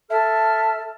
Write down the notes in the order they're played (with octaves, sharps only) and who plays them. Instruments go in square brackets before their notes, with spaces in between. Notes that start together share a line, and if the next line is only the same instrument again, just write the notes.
[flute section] A4 A5 F6 [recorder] E5